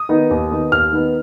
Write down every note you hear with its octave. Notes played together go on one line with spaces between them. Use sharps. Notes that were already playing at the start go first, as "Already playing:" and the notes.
Already playing: D#6
D#3 B3 D#4
D#2
D#3 B3 D#4
D#2 F6
D#3 B3 D#4